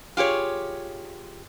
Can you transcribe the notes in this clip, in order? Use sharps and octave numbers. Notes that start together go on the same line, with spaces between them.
F4 G4 G#4 C#5